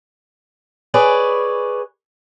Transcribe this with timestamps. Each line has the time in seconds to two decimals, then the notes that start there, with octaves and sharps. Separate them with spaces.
0.94 G#4 B4 C#5 D5